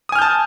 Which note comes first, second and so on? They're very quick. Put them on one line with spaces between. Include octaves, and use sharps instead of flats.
D#6 G#5 F6 G6 A5